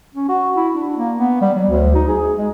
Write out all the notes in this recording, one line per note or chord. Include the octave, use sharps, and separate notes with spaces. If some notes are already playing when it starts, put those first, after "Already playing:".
C#4
F#4
E4
D4
A#3
B3
G3
F#3
D2
D#4
G#4
G#3